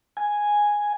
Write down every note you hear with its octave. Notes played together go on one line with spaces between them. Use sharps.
G#5